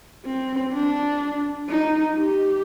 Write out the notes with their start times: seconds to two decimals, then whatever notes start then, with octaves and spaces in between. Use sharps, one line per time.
0.26 C4
0.74 D4
1.69 D#4
2.17 G4